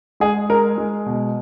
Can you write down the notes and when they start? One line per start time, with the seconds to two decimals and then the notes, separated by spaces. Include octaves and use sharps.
0.20 G#3 G#4
0.50 G#3 A#4
0.78 G#3
1.06 B2